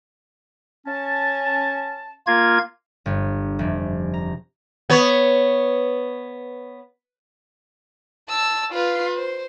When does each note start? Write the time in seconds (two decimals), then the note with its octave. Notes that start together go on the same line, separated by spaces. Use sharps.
0.86 C#4 A5
2.27 A#3 F4 G#6
3.06 G1
3.59 F1
4.14 A#5
4.90 B3 C#5
8.29 A5 E6
8.72 F4 B4
9.16 C5